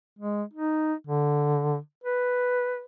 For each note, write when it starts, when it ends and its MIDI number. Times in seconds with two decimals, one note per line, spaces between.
0.19 0.43 56
0.53 0.94 63
1.07 1.78 50
2.04 2.85 71